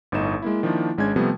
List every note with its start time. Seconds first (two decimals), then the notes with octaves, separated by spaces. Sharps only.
0.12 G1 A2 D#4 E7
0.42 G#3 A#3 E4
0.63 D#3 F3 A#3 D4 E4
0.98 G#1 G#3 C#4 D4 G#6
1.16 C3 F3 G3 A3 B3